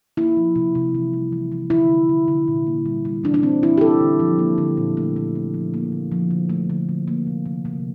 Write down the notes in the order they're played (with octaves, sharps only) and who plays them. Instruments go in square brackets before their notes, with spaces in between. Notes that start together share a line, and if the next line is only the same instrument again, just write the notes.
[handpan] A#3 E4
F3
C3
C3
E3
G3
E3
E3
D3 E4
D3
D3
D3
A#2
A#3
G3
G3
E3 D4
D4
E3 C4
E3 E4
G4
E3 A4
D3
F3
A#3
D3
A#2
A3
A3
A3
F3
A#3
D3
F3
D3
A3
D3
D3
A#3
C3
C3
C3